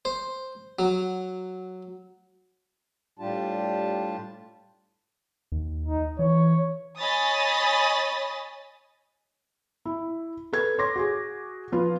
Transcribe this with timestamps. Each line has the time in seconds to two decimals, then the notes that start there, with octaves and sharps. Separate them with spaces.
0.05 C5
0.79 F#3
3.19 A2 G3 D4 F4 G4 A5
5.52 D#2
5.86 D#4
6.19 E3 C#5
6.99 C#5 D#5 G#5 B5 D#6 A6
9.85 E4
10.53 A4 B4 G#6
10.78 C#5 C6 D6 A#6
10.96 F#4 G#4
11.72 F3 F4 B4